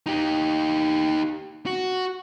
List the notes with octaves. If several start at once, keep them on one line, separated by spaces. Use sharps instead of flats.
D#4 G4
F#4